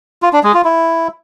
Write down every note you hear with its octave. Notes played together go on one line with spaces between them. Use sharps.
F4
D4
G#3
F4
E4